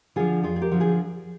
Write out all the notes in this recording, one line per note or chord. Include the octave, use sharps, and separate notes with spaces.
D3 F3 F4 G#4
F2 F4 G#4
G#4
G4 A#4
D3 F3
F4 G#4